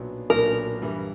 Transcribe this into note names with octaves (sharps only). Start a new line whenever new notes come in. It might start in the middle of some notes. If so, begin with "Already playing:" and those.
Already playing: B1 A#2 F#3 B3 D4
B1 A#2 F#3 B3 D4 A#4
G2 E3 G3